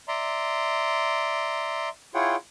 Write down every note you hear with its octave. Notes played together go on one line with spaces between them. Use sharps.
D5 E5 A#5 C6
E4 F4 G#4 C#5 F#5 G5